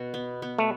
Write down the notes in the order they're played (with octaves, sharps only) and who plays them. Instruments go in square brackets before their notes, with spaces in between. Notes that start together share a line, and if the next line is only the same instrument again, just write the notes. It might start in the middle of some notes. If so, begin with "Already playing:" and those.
Already playing: [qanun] B2 F#4
B3
B3
[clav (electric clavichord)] A3